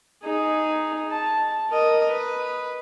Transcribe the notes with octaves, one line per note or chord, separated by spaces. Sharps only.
D#4 G#4
A5
A#4 D#5
B4